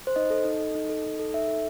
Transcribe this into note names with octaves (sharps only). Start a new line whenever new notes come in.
C5
D#4 D#5
A4
D#4
A4
D#4
A4
D#4
A4
D#4 E5
A4